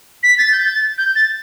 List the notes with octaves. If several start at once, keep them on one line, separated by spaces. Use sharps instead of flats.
B6
A6
G6
A6
G6
A6